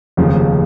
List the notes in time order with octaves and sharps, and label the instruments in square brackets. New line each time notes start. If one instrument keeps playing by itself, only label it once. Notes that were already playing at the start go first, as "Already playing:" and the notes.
[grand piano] F1 D#2 C#3 F3